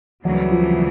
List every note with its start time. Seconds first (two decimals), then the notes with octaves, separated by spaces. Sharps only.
0.25 D2 C#3 E3 F#3 G3
0.51 F3